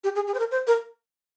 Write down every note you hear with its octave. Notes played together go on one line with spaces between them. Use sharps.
G4
G#4
G#4
C5
A#4
C5
A#4